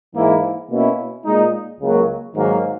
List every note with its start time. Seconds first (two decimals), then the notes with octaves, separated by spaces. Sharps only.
0.15 G#2 E3 A#3 E4
0.70 B2 A#3 C#4 E4
1.25 A#2 G#3 D#4
1.80 C#2 C#3 F#3 A#3
2.35 G#2 D#3 F#3 A#3